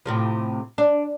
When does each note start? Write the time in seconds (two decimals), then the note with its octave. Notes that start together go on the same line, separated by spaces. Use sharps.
0.06 A2 C3 F3
0.78 D4